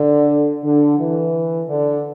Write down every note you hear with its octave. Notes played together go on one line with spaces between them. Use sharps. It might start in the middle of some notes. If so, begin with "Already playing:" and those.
Already playing: D3
D3
E3
D3